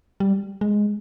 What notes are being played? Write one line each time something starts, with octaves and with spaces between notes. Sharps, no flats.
G3
G#3